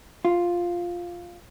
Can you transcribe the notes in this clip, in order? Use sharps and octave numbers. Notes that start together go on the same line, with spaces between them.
F4